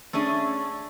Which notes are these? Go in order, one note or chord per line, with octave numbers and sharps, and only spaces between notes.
A3 C#4 D4 G#4